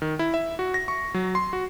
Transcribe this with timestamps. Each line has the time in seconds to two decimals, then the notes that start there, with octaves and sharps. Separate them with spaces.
0.02 D#3
0.19 E4
0.34 E5
0.59 F#4
0.74 A#6
0.88 C#6
1.14 F#3
1.35 C6
1.53 F#4